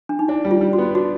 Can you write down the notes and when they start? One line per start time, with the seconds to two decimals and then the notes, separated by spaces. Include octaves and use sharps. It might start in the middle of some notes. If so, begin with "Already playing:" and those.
0.09 D4
0.19 D#4
0.28 D4 E4
0.45 G3
0.51 F4
0.61 G3
0.73 F#4
0.78 B3
0.94 D4 F#4